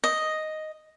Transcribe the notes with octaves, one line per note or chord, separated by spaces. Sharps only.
D#5